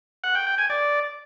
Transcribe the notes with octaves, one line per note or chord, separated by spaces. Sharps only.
F#5
G5
G5
G#5
D5